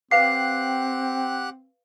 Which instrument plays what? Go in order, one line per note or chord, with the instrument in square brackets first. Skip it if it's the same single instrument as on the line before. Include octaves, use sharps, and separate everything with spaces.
[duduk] C4 [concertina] G4 F#5 F#6 [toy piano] B4 F5 D6 [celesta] C7